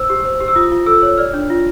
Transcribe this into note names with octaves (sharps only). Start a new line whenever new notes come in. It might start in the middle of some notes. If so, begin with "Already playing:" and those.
Already playing: C5 E6
G4
C5
G4
E6
F4 D#6
F4
A4 E6
C#5
D5 F6
D4
F4